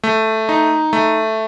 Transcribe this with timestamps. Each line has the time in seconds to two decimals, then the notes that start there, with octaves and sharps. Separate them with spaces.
0.04 A3
0.49 D#4
0.93 A3